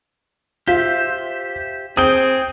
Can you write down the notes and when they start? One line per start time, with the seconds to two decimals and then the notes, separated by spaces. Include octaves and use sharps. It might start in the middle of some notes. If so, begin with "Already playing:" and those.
0.68 F4 G4 C5 E5
1.97 C4 G#4 G5 D#6